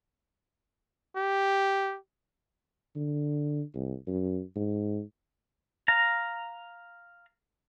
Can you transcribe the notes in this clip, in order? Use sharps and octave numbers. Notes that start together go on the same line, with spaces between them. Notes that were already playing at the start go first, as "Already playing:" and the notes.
G4
D3
C2
F#2
G#2
F5 A#5